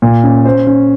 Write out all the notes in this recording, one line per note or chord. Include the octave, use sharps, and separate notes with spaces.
A#2
C#4
C5
C#4